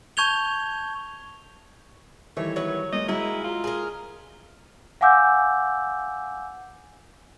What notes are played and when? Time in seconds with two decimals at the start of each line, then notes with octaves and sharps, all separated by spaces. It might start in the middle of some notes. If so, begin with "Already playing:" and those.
0.17 A5 C#6 G6 G#6 F7 G7
2.37 D#3 E3 G3 A3 C#5
2.56 F#3 B3 C#5
2.93 G#3 A#3 D#5
3.08 G#3 A#3 D#4 E4 F#4 G#4
3.44 F4
3.64 G#4 A#4
5.01 F5 F#5 G#5 D6 E6 G6